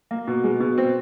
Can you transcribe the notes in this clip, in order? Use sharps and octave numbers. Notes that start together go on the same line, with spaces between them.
A#3
B2
G#3
B2
C4